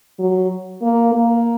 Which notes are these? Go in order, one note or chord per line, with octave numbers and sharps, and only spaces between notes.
F#3
A#3
A#3